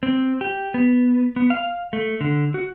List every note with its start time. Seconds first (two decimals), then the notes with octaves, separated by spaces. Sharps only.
0.03 C4
0.41 G4
0.74 B3
1.36 B3
1.50 F5
1.93 A3
2.21 D3
2.54 F#4